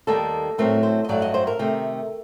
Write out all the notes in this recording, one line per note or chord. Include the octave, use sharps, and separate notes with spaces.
D#2 D#3 G3 A#3 A4
A2 F#3 A3 C4 A#4
C5
D#5
G2 F#3 A3 D5
D#5
C5
A#4
C3 D#3 A3